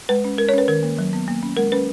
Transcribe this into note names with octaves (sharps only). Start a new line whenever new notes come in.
G#3 B4
C#4
G#3 A#4
C#5
C#4 B4
D#3 A#4
A#3
F#3
B3
A#3
C#4
G#3 A#4
C#4 B4